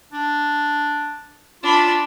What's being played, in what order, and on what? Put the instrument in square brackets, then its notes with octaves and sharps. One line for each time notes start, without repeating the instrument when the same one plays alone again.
[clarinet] D4
[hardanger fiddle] D4 B5 [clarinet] F4